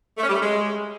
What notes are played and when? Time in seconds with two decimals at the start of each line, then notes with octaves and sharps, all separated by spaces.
0.18 A3
0.23 C#4
0.29 G3
0.34 A3
0.40 G#3